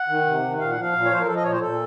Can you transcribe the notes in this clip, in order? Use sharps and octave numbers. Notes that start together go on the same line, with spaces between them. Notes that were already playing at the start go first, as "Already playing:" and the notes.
Already playing: F#5
D#3
C3
D#3
A#2 F5
F#5
F3 F5
A#2
C#5
F3 C5
A#4
F3 A4
D#5
A#2 C#5
C5
A#2 A4